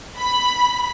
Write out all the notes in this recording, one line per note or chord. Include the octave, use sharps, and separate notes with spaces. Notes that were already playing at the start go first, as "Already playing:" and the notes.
B5